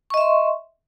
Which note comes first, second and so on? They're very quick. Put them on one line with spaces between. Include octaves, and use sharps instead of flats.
C#6 D#5 E5 C6